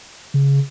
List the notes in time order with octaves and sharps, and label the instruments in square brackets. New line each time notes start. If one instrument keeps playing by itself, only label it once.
[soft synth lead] C#3